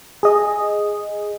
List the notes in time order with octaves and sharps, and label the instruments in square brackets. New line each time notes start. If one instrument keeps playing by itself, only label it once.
[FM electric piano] G#4 D#5